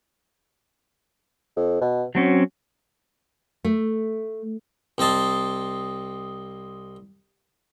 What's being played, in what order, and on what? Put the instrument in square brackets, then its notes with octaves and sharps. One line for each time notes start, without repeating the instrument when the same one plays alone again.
[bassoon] F2
B2
[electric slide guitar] F#3 C4 C#4 [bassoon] F#4
[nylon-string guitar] A3
[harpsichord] C2 C4 D#5 A5 C6